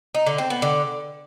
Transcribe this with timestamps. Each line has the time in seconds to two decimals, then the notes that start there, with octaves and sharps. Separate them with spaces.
0.15 D#4
0.27 D3
0.38 C4
0.50 B3
0.62 D3